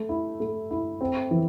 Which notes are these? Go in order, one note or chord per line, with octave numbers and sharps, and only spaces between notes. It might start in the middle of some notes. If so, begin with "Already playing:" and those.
Already playing: A3
E4
A3
E4
C4
E3